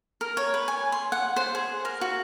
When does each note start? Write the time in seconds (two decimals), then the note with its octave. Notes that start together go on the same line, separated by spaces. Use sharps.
0.21 A#4
0.37 C#5
0.54 B4
0.68 G#5
0.92 C6
1.12 F#5
1.36 C5
1.55 G#4
1.85 A#4
2.01 F#4